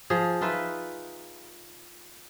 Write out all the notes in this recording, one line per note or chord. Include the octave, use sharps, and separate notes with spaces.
F3 G#4
D#4 F4 B4 E5